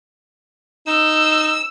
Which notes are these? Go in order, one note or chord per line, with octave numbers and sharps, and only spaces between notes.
D#4 E6